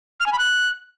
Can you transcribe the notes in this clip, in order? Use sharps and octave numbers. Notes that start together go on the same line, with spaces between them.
F6
G#5
B5
F#6